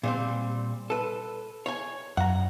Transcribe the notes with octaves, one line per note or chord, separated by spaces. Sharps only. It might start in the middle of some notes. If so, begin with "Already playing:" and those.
A#2 G3 C4
A4 B4
C#5 G#5
F#2 F#5 A#5